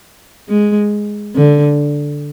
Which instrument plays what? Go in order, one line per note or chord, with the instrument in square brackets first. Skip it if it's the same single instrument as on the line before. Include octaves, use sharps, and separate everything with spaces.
[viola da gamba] G#3
D3